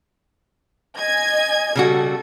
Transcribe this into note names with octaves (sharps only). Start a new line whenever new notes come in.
D#5 G#5 G#6
C#3 G3 F#4 A4